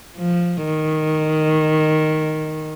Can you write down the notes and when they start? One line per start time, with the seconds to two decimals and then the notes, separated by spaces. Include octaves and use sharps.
0.17 F3
0.65 D#3